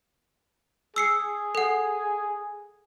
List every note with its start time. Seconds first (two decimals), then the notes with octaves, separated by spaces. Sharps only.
0.96 G#4 E6 C7 C#7
1.55 A4 F#5